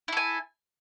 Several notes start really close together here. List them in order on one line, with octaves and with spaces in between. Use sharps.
E4 A4 G#5